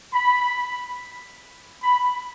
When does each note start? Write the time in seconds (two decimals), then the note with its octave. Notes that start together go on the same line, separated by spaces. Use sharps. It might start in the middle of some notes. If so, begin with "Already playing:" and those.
0.13 B5
1.82 B5